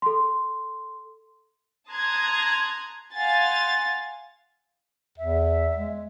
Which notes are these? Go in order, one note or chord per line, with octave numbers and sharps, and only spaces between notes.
A4 C6
A5 A#5 C6 D#6 F#6 G#6
F5 F#5 G#5 C6 A6
E2 E5
G#3